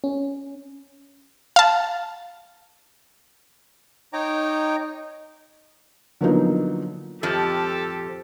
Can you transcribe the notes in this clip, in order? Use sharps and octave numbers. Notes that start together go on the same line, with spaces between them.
C#4
F5 A5
D#4 C#5 D#5 G5 A#5 D6
D3 F3 F#3 A#3 B3 D#4
F2 F3 G4 A4